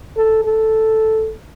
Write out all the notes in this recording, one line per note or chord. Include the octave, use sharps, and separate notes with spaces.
A4
A4